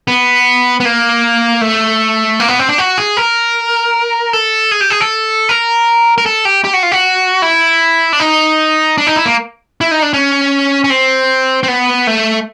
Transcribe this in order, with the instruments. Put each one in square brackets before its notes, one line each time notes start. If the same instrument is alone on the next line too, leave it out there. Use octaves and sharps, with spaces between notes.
[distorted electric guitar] B3
B3
A#3
A3
A#3
B3
C4
D4
F#4
G#4
A#4
A4
G#4
G4
G#4
A4
A#4
A#4
A4
G4
G4
F#4
F4
F#4
E4
D4
D#4
D4
D#4
E4
A#3
E4
D#4
D4
C#4
C#4
C4
C4
B3
A3